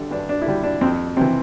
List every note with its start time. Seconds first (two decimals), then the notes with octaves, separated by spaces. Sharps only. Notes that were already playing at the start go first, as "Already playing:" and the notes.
Already playing: D3 G3 A4 E5
0.11 G2 D4
0.29 D4
0.42 E4
0.46 D3 G3 D4
0.64 D4
0.81 F2 C4
1.17 C3 E3 C4